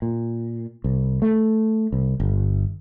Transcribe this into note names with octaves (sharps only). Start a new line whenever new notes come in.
A#2
C2
A3
C2
G1